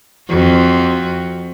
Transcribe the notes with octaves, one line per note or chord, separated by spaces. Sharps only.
F2 F#4